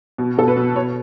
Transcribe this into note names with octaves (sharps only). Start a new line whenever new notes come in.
B2
B2 A4
B4
B2
B2 C#5